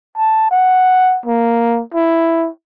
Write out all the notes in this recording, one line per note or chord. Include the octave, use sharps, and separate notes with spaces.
A5
F#5
A#3
E4